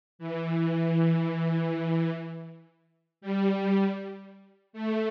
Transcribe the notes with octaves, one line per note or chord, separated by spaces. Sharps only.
E3
G3
A3